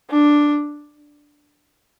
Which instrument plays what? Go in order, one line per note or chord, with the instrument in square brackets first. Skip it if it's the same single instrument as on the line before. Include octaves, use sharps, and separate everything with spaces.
[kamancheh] D4